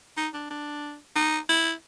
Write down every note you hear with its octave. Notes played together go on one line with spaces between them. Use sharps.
D#4
D4
D4
D#4
E4